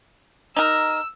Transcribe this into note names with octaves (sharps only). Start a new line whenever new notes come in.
D#4 A#4 E6